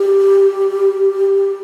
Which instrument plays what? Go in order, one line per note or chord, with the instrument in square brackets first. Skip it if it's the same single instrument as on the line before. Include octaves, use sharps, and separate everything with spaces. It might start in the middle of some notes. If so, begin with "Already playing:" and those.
Already playing: [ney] G4